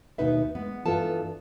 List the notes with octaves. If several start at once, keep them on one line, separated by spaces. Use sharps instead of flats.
D#2 B2 B3 D#4 B4 E5
G#3 B3
G2 E3 B3 F4 A4 A5